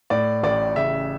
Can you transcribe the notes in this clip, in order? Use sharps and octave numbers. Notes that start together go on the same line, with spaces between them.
A2 D5
A1 D5
C#3 E5